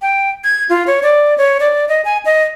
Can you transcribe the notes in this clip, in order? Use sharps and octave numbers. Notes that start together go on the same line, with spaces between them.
G5
G#6
F4
C#5
D5
C#5
D5
D#5
G#5
D#5